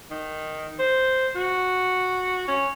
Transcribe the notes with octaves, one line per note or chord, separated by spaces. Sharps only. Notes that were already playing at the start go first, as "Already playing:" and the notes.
D#3
C5
F#4
C#4